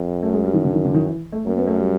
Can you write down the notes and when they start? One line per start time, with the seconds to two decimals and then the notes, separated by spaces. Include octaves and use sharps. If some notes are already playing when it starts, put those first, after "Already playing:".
Already playing: F2
0.22 F#2 A3
0.33 G#3
0.44 G3
0.54 D#3
0.64 D3
0.74 D#3
0.85 D3
0.90 E3
0.94 D#3
1.06 E3
1.32 A3
1.46 F#2 A#3
1.57 B3
1.67 A3
1.78 G3